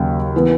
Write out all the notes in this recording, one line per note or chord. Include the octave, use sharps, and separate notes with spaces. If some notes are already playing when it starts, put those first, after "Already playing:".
Already playing: D#2 C#3 F#3
E3 B3